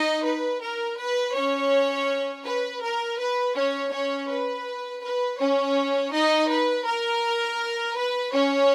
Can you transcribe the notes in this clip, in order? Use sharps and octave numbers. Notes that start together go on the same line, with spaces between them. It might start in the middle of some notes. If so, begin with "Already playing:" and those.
Already playing: D#4 D#5
B4
A#4
B4
C#4 C#5
B4
A#4
B4
C#4 C#5
C#4 C#5
B4
B4
C#4 C#5
D#4 D#5
B4
A#4
B4
C#4 C#5